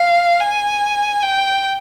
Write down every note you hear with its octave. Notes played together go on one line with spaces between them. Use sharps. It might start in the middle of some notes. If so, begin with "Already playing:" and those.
Already playing: F5
G#5
G5